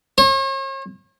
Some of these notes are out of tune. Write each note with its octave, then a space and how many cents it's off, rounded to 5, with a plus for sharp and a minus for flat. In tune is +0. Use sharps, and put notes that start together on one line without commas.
C#5 -45